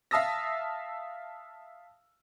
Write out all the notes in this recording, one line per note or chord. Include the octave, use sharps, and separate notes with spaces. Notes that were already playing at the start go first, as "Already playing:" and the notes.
E5 F5 A5 D#6 E6 A#6